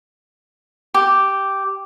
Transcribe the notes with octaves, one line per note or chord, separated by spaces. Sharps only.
G4